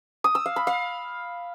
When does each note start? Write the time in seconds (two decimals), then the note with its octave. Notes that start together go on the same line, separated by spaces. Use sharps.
0.24 D#6
0.35 E6
0.46 F5
0.56 B5
0.67 F5